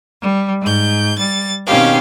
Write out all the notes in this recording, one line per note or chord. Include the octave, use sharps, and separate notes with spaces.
G3
G#2 G6
G3 A6
B2 D#3 C4 C#4 G4 F5